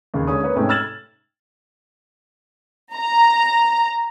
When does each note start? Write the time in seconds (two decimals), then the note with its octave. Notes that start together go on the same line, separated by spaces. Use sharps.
0.14 D#2 C#3
0.27 D3 G#3 C#4 D#6
0.44 A#3 B4 C#5
0.55 G#2 C3 A3 C#4 G5
0.69 E6 F6 G#6 A6 E7 F#7
2.95 A#5